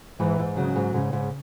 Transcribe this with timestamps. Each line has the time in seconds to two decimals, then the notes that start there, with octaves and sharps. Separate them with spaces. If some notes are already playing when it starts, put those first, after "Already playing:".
0.20 G#2 E3
0.39 G#2
0.57 C#3 F#3
0.76 G#2
0.94 G#2 C#3
1.13 G#2